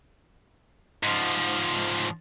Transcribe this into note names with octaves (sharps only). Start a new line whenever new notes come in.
G#2 F3